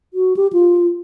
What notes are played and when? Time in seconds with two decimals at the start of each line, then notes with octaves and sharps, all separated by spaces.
0.14 F#4
0.37 G4
0.53 F4